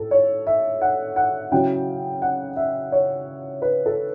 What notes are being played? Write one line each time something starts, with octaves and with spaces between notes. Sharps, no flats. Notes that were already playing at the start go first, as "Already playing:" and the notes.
Already playing: A2 A4
C#5
E5
F#5
F#5
C#3 F#3 C#4 E4 G5
F#5
E5
C#5
B4
A4